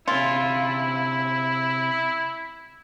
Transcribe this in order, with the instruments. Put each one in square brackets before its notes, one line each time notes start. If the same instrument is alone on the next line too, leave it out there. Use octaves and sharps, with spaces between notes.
[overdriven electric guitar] C3 C#4 [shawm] E4 [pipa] F4